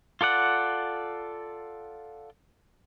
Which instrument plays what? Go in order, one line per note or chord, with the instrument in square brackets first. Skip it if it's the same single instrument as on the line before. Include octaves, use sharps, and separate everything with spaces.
[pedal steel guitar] F4 A4 D5 F#5